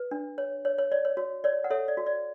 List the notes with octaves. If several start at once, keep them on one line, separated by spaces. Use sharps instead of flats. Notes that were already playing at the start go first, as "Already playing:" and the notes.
Already playing: B4
D4
C#5
C#5
C#5
C#5 D5
C#5
F#4 C#5
C#5 D5
F#5
A4 C#5 E5
D5
F#4
D5